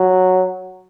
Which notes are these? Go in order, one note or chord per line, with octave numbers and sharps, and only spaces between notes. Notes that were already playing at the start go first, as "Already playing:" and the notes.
Already playing: F#3